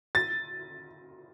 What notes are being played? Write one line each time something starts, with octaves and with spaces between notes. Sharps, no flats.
A6